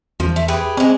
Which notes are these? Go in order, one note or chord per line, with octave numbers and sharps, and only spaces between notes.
E2 F3
A3
G4 G#4 B4
G#3 C4 D4